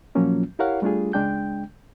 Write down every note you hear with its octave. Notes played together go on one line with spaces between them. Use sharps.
A#2 F3 F#3 A#3 C#4 F4
E4 G4 A#4 C#5 F5 F#5
G3 A3 D4 F4 G#4
C#2 G#3 D4 G5 G6